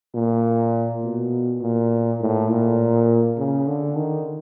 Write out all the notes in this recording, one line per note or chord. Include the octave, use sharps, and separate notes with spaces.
A#2
B2
A#2
A2
A#2
C#3
D3
D#3